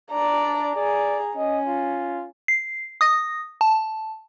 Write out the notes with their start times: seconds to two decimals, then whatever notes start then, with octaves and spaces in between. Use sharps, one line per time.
0.11 D4 D5 A#5
0.75 G#4 D5 A#5
1.37 C#4 D#5
1.68 F4
2.48 C7
3.01 D#6 A#6
3.61 A5